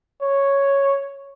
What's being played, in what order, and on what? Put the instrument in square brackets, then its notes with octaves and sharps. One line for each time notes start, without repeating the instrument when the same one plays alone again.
[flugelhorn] C#5